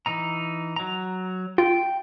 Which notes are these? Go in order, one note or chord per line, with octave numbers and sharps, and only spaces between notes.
E3 D#4 A#5
F#3 A#5
F4 G5